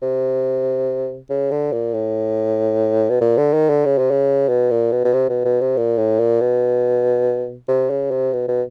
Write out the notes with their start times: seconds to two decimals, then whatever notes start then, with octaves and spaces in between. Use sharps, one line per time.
0.02 C3
1.30 C#3
1.51 D3
1.72 A#2
1.94 A2
3.09 B2
3.21 A#2
3.37 D3
3.53 D#3
3.70 D3
3.85 C#3
3.98 C3
4.11 C#3
4.49 B2
4.70 A#2
4.92 B2
5.05 B2
5.13 C3
5.29 B2
5.45 B2
5.60 C3
5.77 A#2
5.98 A2
6.19 A#2
6.41 B2
7.68 C3
7.90 C#3
8.11 C3
8.33 B2
8.48 B2